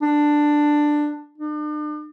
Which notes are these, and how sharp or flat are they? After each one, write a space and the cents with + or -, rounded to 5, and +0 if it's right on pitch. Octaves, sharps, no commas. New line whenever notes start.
D4 +10
D4 +45